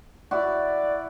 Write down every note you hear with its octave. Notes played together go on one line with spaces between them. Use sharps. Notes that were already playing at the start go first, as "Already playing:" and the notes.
E4 F#4 D5